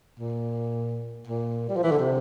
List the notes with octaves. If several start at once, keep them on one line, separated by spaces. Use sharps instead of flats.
A#2
A#2
G3
F3
E3
D3
C3